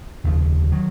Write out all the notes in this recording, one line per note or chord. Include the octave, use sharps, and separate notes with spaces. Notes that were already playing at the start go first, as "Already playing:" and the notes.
F1 D#2 C#3 F3
D#3 F#3